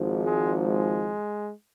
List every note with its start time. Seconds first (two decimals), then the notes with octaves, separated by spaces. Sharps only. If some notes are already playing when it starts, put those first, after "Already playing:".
Already playing: G#1 G#2 F3
0.25 G#3
0.66 G#3